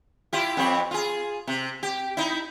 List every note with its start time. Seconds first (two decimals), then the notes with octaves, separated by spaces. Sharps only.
0.33 E4 F4 G4
0.57 F2 C4 C#5
0.91 F4 G#4
1.47 C3
1.83 G4
2.17 D#4 E4